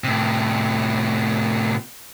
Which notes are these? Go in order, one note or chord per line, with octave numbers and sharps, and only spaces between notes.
A2 C3